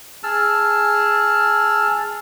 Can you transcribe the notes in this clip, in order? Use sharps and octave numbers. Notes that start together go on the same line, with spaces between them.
G#4 A5 E6 F6